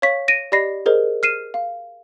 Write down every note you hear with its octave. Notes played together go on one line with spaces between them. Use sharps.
C#5 F5 C#6 B6
A#6 D7 D#7
G4 D5 D#5 B5 A#6 C7
G#4 A#4 C5 D#5
F6 C7 D#7 E7
F5